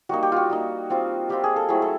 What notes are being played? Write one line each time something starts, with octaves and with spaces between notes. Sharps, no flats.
G3 A#3 D#4 F#4
G4
F4 F#4
G3 A#3 D#4
G3 C4 F4
G3 C4 F4 G4
G#4
A4
F#3 A3 C4 E4 G#4
A4